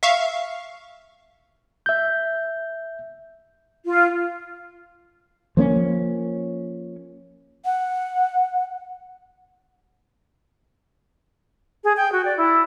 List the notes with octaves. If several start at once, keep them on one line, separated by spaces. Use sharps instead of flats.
E5 F5 C#6
E5 G6
F4
F3 A#3 C#4
F#5
G#4
G5
F#4
D5
E4